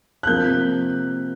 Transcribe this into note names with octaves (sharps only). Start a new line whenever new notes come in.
F#6
C3 F3 A#3 G6